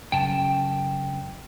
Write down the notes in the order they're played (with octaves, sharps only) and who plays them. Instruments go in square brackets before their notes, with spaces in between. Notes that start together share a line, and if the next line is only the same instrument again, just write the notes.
[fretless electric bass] F#2 C#3 [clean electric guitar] G5 A5